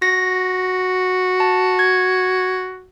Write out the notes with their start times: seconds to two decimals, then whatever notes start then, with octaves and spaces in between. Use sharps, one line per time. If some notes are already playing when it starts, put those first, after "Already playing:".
0.02 F#4 A#6
1.40 A5
1.79 G#6